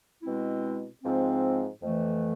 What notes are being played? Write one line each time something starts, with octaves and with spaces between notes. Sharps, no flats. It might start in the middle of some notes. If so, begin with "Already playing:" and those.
B2 G#3 C4 E4
G#2 F3 G#3 C4
F2 E3 A3